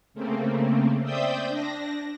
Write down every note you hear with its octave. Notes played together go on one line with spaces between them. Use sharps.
C#3 A3 A#3 C4
C5 D5 E5 G5 D#6 G6
D4 A#6